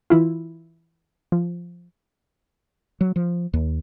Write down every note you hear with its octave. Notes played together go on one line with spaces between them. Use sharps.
E3 E4 F4
F3
F#3
F3
D#2